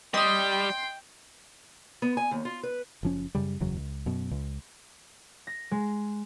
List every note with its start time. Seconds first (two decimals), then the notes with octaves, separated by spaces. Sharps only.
0.14 G3 D#5 G5 C6 D#6
2.02 B3
2.17 G#5
2.31 D#2
2.45 F4
2.63 B4
3.03 F#1 F3 C#4
3.35 F#2 C#3 G3
3.60 F#1 E2 C#3 F#3
3.77 C#2
4.06 F#2 B2
4.31 C#2
5.47 A#6
5.71 G#3